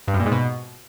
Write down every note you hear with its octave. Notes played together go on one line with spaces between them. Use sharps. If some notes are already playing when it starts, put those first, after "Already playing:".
G2
F#2
A#2
G#2
B2